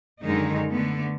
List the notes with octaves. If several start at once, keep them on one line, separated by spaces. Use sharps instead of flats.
F#2 D3 D#3 G#3 D#4
D3 A3 B3